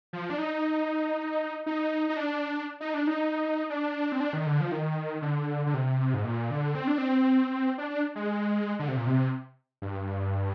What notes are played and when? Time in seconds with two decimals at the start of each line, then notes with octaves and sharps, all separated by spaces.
0.13 F3
0.30 D4
0.38 D#4
1.66 D#4
2.09 D#4
2.16 D4
2.80 D#4
2.94 D4
3.07 D#4
3.70 D4
4.12 C4
4.21 D4
4.33 D#3
4.47 D3
4.61 F3
4.72 D#3
5.22 D3
5.66 D3
5.74 C3
6.14 G#2
6.25 A#2
6.51 D3
6.75 C4
6.87 D4
6.98 C4
7.78 D4
7.90 D4
8.15 G#3
8.79 D3
8.88 C3
8.97 A#2
9.07 C3
9.82 G2